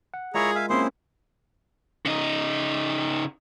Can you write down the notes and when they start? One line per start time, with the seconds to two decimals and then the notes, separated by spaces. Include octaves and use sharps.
0.14 F#5
0.35 G#3 E4 F4 G#4 A#4 C#5 A#5
0.55 E5 F5 G#5
0.70 A#3 C4 C#4 E4 G#4 C5 C6
2.06 C#3 D#4